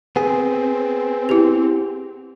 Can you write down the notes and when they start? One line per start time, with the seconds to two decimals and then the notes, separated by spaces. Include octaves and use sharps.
0.16 B3 C4 G#4
1.29 E4 G4